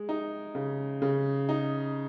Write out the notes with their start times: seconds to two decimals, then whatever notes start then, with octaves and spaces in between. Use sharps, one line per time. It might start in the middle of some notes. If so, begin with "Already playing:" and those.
Already playing: G#3
0.09 D#4
0.55 C#3
1.02 C#3
1.49 D#4